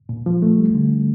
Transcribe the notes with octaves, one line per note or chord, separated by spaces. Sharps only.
A#2
F3
A3
G3
D3